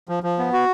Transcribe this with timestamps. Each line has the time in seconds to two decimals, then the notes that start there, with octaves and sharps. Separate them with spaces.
0.09 F3
0.23 F3
0.38 B3
0.53 F#4